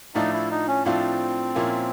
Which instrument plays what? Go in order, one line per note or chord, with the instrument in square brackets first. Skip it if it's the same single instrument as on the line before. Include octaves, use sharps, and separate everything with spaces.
[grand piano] A2 F3 A3 D4 F4 [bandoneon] D#4
[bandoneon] E4
D#4
C#4
[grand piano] A2 F3 A3 D4 F4 [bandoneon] C4
[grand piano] A#2 F3 A#3 C#4 E4